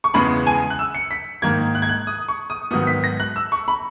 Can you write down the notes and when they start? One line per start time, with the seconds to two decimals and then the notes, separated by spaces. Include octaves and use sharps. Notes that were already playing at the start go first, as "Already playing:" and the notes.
0.04 C#6
0.14 E2 C#3 G#3 B3 B5
0.47 G#5
0.70 F#6
0.79 E6
0.95 C#7
1.11 B6
1.42 G#2 D#3 A#3 G#6
1.75 F#6
1.82 G#6
1.89 F#6
2.07 D#6
2.28 C#6
2.50 D#6
2.71 G#2 D#3 F#3 B3 D#6
2.87 B6
3.04 A#6
3.20 F#6
3.36 E6
3.52 C#6
3.68 B5